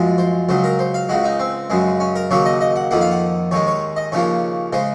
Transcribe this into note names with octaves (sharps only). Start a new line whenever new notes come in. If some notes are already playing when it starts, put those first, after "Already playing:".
Already playing: F#2 F3 G#3
C5
C#2 C#3 F#3 C5
A#4
C5
F5
C#2 C#3 G#3 F#4
D#4
C4
F#2 C#3 G#3
C#4
A#4
D#2 C#3 F#3 A#3 C#5
D#5
D#5
F#5
F2 D#3 A#3 F#5
F5
F#5
D#2 D#3 G#3 C#5
C#5
D#5
D#2 C#3 F3 A#3 C#5
C#3 G#3 C5